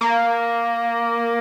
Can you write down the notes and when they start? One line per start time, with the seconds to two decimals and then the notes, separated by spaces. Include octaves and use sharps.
0.01 A#3